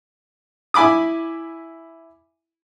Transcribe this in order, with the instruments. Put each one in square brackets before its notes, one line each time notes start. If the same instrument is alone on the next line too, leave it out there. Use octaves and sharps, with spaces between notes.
[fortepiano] E4 G#5 B5 D6 D#6